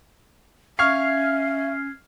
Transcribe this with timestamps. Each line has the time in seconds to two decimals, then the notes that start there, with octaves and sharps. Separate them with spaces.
0.79 C#4 E5 F5 C#6 F6 G#6 C7